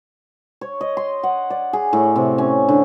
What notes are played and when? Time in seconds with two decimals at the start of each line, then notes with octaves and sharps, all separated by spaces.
0.61 C#5
0.81 D#5
0.97 C6
1.23 F#5
1.50 D5
1.73 G#4
1.93 A2
2.16 C3
2.38 C#4
2.69 D3